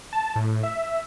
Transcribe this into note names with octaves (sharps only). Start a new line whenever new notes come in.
A5
A2
E5